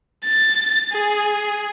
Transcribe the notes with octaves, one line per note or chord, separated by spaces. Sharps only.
A6
G#4